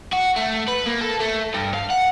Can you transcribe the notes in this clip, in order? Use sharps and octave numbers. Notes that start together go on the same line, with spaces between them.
F#4
A3
B4
A#3
A4
A3
G2
F5
F#5